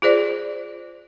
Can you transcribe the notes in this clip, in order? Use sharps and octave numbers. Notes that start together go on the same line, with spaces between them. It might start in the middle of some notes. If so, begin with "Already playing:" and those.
F4 G#4 C5 D5